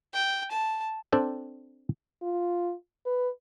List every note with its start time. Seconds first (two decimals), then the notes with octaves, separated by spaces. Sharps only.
0.13 G5
0.51 A5
1.12 C4 D4 A4 G5
2.22 F4
3.06 B4